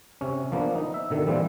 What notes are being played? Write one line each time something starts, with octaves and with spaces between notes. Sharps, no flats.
C3 C#4
F3 A#3 B3 D4
D#4
E5
B2 D3 D#3
A#2 E3 F3 G3 C4